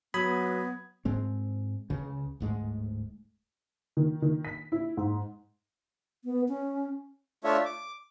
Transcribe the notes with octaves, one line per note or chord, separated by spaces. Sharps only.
F#3 B3 B5 D#6 G#6
G#2 G#3 C4
C#2 C#3
D1 G#2 G#3 A3
D#3
D#3
B6
E4
G#2
B3
C#4
A3 D4 F4 C#5 E5
D6